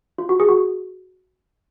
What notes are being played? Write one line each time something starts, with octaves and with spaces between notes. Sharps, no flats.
F4
F#4
G#4
F#4